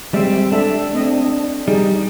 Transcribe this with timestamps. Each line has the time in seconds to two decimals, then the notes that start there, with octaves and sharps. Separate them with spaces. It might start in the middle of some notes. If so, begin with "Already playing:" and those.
0.14 G3 G#3 C4 E5
0.52 D4 A4 E5
0.93 A3 C4 D#5
1.68 G3 D#4 G#4